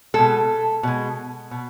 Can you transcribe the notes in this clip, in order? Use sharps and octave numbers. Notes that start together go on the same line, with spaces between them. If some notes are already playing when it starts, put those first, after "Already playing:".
B2 G#3 A4
B2 G#3
B2